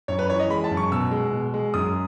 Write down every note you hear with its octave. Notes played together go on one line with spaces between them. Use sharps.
F#2 C#5
B4
E3 C#5
D#5
G#3 B5
A5
F#2
C#6
B2 E6
G#3
B2
G#3
F#2 D#6